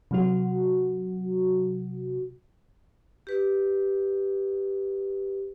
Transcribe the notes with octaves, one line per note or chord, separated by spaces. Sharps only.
C3 F#3 F#4
G4 B4